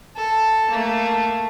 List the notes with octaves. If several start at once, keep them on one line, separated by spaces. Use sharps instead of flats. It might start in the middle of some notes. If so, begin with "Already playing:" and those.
A4
A3 A#3